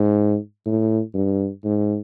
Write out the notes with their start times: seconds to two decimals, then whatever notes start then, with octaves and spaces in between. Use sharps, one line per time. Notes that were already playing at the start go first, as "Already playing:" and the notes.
Already playing: G#2
0.66 A2
1.14 G2
1.64 G#2